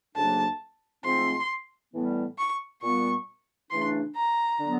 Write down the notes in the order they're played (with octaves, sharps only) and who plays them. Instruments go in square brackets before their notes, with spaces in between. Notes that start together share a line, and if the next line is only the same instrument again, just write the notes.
[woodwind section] D2 C#3 F#3 A#3 D4 [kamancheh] A5
[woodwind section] G#2 F3 A3 C4 [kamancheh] C6
[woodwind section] A2 E3 G3 B3
[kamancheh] C#6
[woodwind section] A#2 G3 B3 [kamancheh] C#6
[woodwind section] C#3 E3 A3 D4 [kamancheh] C6
[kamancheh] A#5
[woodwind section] D3 F#3 B3